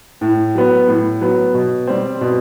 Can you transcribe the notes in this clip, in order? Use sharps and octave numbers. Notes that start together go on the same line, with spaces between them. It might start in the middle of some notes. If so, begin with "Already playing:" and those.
A2
F#3 B3
A2
F#3 B3
B2
G3 C4
B2